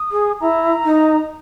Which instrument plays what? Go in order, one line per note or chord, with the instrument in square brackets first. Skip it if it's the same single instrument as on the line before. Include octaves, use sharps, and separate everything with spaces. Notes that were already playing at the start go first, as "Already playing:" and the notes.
Already playing: [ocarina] D#6
[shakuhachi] G#4
[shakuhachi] E4 [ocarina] A#5
[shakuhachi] D#4